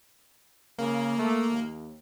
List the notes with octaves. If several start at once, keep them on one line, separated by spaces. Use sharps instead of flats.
C#3 A#3
A3
D#2